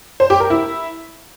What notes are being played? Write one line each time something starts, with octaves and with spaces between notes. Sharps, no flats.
C5
G4
A#4
E4